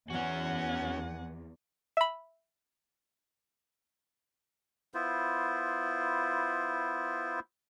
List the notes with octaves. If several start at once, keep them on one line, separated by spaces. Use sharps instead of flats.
E2 C#4 F#4 F#5 G#5
E5 B5
B3 E4 F4 C5